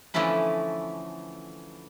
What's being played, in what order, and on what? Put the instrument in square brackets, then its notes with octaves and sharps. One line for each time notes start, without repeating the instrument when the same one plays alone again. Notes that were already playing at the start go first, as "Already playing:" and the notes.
[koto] D3 E3 F3 A3 C#4 E4